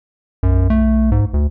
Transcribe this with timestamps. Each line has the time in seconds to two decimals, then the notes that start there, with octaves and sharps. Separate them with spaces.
0.43 B1 F#2
0.70 A3
1.12 G#2
1.34 D2